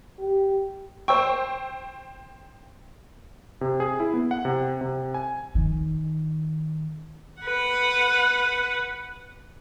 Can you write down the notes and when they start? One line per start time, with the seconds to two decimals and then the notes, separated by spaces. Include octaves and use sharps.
0.20 G4
1.08 C5 G5 C#6 E6
3.61 C3
3.80 G#4
4.00 E4
4.14 B3
4.31 F#5
4.45 C3
4.81 C3
5.14 G#5
5.55 D#3
7.41 B4 F#5